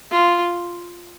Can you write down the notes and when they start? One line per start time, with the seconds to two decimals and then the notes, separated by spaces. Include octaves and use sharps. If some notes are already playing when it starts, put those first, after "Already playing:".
0.11 F4